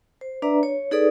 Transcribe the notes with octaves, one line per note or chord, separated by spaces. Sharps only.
C5
D4 B4 D5 E5 A#5
C#5
D#4 G#4 A4 B4 D5 D#6